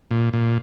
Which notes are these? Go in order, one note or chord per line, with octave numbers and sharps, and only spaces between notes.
A#2
A#2